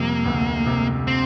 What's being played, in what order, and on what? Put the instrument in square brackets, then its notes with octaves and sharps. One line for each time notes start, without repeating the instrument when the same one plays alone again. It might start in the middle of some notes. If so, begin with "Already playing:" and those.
Already playing: [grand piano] F2 C3 G3 [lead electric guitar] A#3
[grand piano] D2
C3
[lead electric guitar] C4